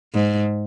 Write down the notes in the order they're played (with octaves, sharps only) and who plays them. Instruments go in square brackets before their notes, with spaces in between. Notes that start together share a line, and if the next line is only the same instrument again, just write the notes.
[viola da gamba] G#2